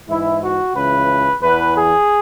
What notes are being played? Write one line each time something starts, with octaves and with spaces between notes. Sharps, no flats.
G#2 E3 E4
F#4
C#2 C#3 E3 B4
E2 E3 B4
G#4